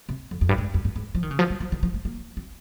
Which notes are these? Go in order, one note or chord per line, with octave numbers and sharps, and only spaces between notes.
C3
F2
F2
G2
G#2
F2
G2
G#2
F3
D#3
C#3
F3
G3
F3
D#3
F3
G#3
A#3
C4